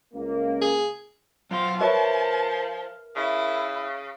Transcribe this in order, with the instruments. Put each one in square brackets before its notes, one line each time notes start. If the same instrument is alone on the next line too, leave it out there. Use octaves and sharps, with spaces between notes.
[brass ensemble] C#2 A#3
[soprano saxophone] G#4
[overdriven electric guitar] F#3 C6 [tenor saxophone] C4 [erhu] F4
[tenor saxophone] F3 [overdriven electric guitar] A#4 [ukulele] B4 C#5 E5 [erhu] A5
[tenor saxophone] C#3 [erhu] E4